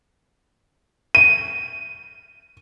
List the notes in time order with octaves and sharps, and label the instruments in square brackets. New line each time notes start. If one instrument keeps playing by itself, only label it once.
[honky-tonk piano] D#7